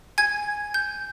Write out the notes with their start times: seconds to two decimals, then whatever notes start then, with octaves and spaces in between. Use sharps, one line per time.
0.18 G#5 G#6
0.74 G6